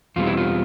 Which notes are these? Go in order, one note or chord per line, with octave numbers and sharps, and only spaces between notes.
E2 B2 G3 C4 F4
E4
F4